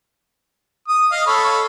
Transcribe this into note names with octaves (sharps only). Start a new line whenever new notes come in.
D#6
D#5 F5
A4 C#5 B5